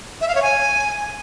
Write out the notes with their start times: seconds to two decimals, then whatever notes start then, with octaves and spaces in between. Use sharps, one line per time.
0.21 E5
0.28 F5
0.35 C#5
0.42 G#5